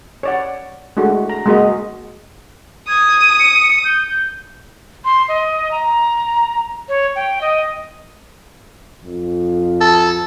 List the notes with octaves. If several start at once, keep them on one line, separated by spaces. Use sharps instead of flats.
C#5 D5 F#5
G#3 A3 D4 F#4
A#5
G#3 A#3 F#4 D#5
D#6 G#6
C#7
G6
C6
D#5
A#5
C#5
G5
D#5
F2
A4